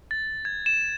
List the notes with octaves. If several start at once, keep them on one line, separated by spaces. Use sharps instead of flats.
A6
G#6
E7